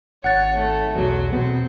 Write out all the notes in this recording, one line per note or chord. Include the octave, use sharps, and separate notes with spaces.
G#1 C#5 F#5 F#6 A6
A3
B1 E2 F#3
B2 B3 C4